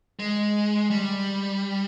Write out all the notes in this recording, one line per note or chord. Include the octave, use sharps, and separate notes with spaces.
G#3
G3